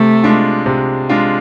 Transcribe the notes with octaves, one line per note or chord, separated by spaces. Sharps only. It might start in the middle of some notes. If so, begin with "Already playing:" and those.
Already playing: C3 A3
G#3 D4 F4
C3
G#3 D4 F4